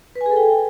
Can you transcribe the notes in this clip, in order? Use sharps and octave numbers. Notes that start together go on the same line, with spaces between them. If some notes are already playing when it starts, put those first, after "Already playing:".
B4
G#5
G#4
A4
G5